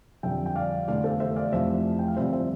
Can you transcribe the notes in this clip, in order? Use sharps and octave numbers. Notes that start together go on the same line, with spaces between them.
F2 D3 G3 E5 G5
G5
D5 F5
F1 E2 D3 D5 F5
A4 C5
C5 E5
D5 F5
F1 F2 E3 C5 E5
G5
F5
G1 F2 C3 G3 C5 E5
C5 E5